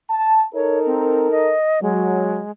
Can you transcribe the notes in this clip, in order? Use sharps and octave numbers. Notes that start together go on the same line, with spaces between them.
A5
D#4 A4 A#4 C#5
C4
D#5
F#3 G#3